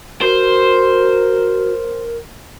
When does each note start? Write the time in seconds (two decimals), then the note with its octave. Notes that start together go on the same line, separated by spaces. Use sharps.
0.22 F#4 A#4 C5